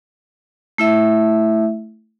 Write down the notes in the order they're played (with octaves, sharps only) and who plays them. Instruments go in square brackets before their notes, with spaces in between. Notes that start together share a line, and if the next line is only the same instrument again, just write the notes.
[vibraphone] A3 E4 E5